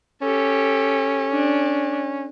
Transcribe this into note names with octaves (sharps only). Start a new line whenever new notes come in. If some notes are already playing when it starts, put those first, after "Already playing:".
C#4 G4 A4
D4